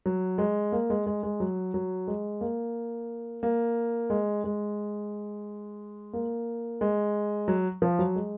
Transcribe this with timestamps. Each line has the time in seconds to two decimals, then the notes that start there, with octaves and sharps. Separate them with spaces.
0.06 F#3
0.38 G#3
0.72 A#3
0.90 G#3
1.06 G#3
1.23 G#3
1.40 F#3
1.74 F#3
2.07 G#3
2.41 A#3
3.43 A#3
4.10 G#3
4.44 G#3
6.13 A#3
6.81 G#3
7.48 F#3
7.82 F3
7.99 F#3
8.16 G#3